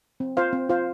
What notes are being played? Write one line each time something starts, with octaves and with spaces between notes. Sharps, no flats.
C4
F4 C5 F5
C4
F4 C5 F5